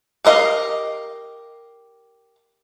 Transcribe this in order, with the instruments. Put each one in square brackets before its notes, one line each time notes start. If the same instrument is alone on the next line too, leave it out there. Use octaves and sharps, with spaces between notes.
[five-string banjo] G4 A#4 D#5 F5